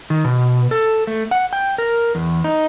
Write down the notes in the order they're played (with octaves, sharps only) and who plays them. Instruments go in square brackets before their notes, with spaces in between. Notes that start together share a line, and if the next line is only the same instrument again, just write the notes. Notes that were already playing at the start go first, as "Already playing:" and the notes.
[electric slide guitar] D#3
B2
A4
A3
F#5
G5
A#4
E2
D#4